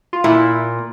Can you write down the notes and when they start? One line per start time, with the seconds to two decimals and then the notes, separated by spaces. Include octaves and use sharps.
0.13 F4
0.24 A#2 E4